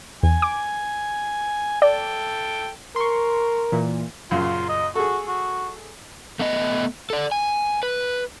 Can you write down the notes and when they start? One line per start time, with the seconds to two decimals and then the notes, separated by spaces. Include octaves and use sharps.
0.23 E2 G#5
0.42 D6
1.82 A4 D5 G5
2.96 A#4 C6 C#6
3.72 A#2 E3
4.31 F#2 A#2 C#3 F4
4.69 D#5
4.95 F#4 G#4 A4
5.28 F#4
6.39 A3 B3 D#5
7.10 A4 D5
7.32 G#5
7.83 B4